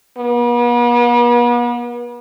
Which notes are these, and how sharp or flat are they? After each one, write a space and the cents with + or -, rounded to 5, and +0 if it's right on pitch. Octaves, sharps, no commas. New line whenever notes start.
B3 -40